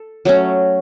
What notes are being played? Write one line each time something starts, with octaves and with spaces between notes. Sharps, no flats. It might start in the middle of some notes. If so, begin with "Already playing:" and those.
Already playing: A4
F#3 A3 C#4